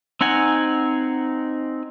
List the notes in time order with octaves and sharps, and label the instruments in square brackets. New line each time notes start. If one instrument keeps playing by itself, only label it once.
[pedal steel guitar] C4 D#4 F#5 G#5